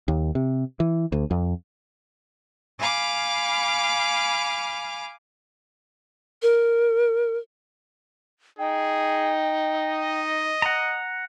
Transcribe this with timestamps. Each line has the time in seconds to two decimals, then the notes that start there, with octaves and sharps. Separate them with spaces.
0.08 D#2
0.35 C3
0.80 E3
1.12 D2
1.31 F2
2.79 F5 G#5 B5 D6 F6
6.42 A#4
8.59 D#4 G#4 G5
9.74 D#5
10.62 F#5 A#5